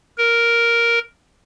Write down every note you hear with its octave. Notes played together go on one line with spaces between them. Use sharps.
A#4